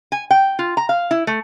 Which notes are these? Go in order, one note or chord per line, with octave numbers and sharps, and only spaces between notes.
G#5
G5
F4
A#5
F5
E4
A3